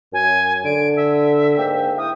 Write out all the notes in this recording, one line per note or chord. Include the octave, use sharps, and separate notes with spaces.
F#2 G#5
D3 D7
E5
G#2 A#3 G5
E4 A#4 G5 D#6